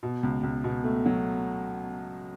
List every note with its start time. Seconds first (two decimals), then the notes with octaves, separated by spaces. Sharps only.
0.03 B2
0.23 C#2
0.43 C#2
0.64 B2
0.84 A3
1.06 F#3